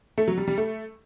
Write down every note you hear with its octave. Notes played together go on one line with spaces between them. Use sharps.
A3
F#3
G3
G3
A3